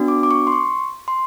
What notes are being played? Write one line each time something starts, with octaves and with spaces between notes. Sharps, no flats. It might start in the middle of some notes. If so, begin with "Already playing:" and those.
Already playing: B3 D4 F#4
D6
D6
C#6
C6
C#6
C6